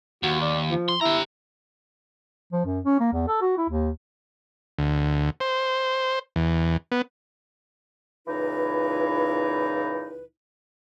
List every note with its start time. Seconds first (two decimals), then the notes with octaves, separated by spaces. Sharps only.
0.23 D#2 F#4
0.41 D5
0.70 F3
0.88 C6
1.01 E4 G4 A#5
2.53 F3
2.65 F#2
2.85 C#4
3.00 A#3
3.13 E2
3.28 A4
3.41 F#4
3.58 E4
3.69 D#2
4.79 D2
5.40 C5
6.36 E2
6.92 B3
8.28 C#2 A#2 E3 D#4 E4 B4